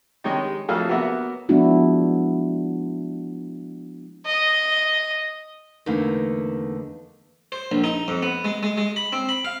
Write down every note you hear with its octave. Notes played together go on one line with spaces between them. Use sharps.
D#3 G3 G#3 C#5 D#5
F2 F#3 A3 G#4 A4 F5
F#3 A#3 B3 F#4 E5 F#5
F3 G#3 B3 D4 E4 F#4
D#5
E2 D3 A3 A#3 D#4
C5
A#1
D#4
F2
B3
G#3
G#3
G#3
B5
C4
B5
F5